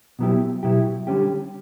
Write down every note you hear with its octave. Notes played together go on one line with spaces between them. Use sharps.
B2 F#3 B3 E4 G4
B2 F#3 B3 E4 G4
D3 G3 C#4 G4